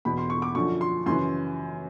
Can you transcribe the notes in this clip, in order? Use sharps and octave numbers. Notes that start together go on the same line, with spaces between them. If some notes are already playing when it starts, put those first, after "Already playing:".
E2 B2 B5
C6
C#6
D6
F#2 D3 F3 C#6
C6
F#2 C#3 E3 C6